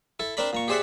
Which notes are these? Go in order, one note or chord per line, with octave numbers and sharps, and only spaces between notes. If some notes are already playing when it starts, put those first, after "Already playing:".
E4 A4
C4 D4 A#4 D5 A#5 B5
A#2 A#5 C#6
G4 G#4 C5 D5 E5 F#5